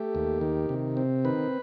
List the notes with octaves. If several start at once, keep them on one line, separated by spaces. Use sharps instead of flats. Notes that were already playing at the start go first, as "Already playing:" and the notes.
Already playing: A3 G4
D#2
D#3
C3
C4
D#3 B4